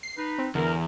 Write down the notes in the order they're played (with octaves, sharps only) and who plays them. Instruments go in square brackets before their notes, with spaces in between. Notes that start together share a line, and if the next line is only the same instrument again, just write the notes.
[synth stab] C7
[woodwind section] D#4 B4
[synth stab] C4
[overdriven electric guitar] E2 [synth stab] D3 [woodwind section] A#4